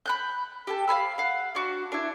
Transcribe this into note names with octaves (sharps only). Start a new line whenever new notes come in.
B5 F#6 G6
G4 A4 A5
F5 G#5 B5 E6
F5 F#5
D4 F#4
D4 E4